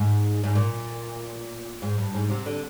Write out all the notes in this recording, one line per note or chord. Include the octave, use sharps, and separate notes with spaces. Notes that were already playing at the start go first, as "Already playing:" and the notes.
Already playing: G#2
G#2
A#2
G#2
G2
G#2
C3
D3